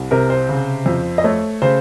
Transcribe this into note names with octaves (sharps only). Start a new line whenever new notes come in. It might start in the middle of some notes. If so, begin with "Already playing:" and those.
Already playing: C2
C3 A#4
C5
C#3
F2
D#5
A3 C#5
C#3 C5